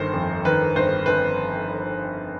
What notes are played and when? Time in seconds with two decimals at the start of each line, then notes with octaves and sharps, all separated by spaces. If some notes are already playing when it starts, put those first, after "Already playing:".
Already playing: G1 D#3 C5
0.13 F2
0.45 D#3 B4
0.76 G1 C5
1.06 G1 B4